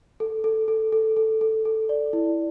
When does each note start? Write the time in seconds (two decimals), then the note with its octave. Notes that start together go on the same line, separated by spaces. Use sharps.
0.20 A4
0.44 A4
0.68 A4
0.93 A4
1.16 A4
1.41 A4
1.65 A4
1.89 D5
2.13 E4